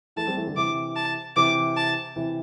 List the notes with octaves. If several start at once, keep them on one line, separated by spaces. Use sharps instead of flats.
E3 A3 A5
G3 C4
E3 A3
D3 G3
C3 E3 D6
A5
C3 E3 D6
A5
C3 E3